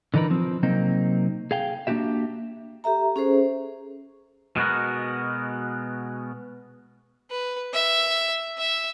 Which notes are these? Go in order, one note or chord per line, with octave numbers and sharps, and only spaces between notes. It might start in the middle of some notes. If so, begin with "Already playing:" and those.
D3 E3 D#4 A#4 B4
F3 C4
C3 F#3 A#3 C4 D#4
G#4 F5 G5
A#3 D4 D#4 F#4 G4 E5
G4 A4 E5 A#5
C#4 G#4 A4 C5
B2 G#3 B3 F#4 A#4
B4
E5
E5